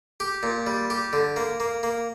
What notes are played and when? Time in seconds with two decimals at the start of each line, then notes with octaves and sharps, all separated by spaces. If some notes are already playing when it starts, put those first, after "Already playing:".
0.20 G4
0.43 A#2
0.67 G3
0.90 G4
1.13 D3
1.36 A#3
1.60 A#3
1.83 A#3